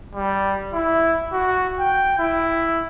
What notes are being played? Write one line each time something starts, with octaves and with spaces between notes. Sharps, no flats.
G3
E4
F#4
G5
E4